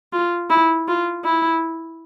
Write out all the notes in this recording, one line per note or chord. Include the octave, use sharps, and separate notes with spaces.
F4
E4
F4
E4